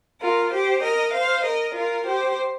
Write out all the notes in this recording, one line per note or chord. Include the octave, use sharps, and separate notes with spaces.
F4 A#4
G4 C5
A#4 D#5
C5 F5
A#4 D#5
F4 A#4
G4 C5